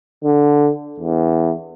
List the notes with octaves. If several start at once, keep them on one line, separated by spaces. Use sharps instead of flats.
D3
E2